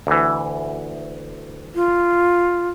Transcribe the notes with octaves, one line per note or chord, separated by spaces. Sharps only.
D2 E3
F4